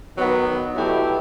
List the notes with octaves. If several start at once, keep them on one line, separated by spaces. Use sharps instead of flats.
D#3 F#3 B3 D#4 F#4
B2 F#3 A3 E4 G4